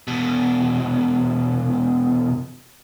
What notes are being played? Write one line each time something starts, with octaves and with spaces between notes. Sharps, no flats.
E2 B2